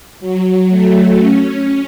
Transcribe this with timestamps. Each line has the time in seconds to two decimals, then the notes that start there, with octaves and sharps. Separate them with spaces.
0.20 F#3
0.69 A3
1.18 C#4